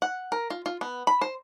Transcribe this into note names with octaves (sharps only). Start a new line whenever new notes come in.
F#5
A#4
F4
F4
B3
B5
C5